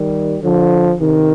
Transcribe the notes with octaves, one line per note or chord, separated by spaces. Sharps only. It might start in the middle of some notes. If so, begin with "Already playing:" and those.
Already playing: D#3 G3
D3 F3
C3 D#3